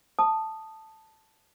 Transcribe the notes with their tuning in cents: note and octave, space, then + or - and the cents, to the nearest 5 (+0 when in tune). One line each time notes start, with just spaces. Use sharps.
A5 +0 D#6 -10